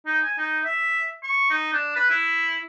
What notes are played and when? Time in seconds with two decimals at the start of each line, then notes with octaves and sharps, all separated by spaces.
0.06 D#4
0.24 G#5
0.38 D#4
0.65 E5
1.23 C#6
1.50 D#4
1.73 D4
1.96 B4
2.10 E4